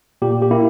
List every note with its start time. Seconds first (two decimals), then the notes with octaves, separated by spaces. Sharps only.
0.22 A#2 G4
0.42 G4
0.51 A#3 E4